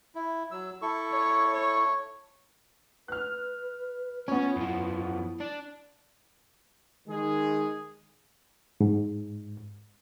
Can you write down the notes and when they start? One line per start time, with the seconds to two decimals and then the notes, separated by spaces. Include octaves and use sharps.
0.15 E4
0.51 F#3 E6
0.82 E4 A4 C#6
1.12 C#5
1.54 C#5
3.08 B4 F6 F#6
4.28 B3 C#4 F4 C#5 C#6
4.56 F#2 F3 E4
5.41 D4
7.08 D#3 G#3 G#4
8.81 G#2